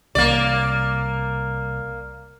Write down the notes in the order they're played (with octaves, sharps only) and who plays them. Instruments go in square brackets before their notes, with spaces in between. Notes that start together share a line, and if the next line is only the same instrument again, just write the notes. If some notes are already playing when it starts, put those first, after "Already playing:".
[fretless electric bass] C2 [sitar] A#3 D5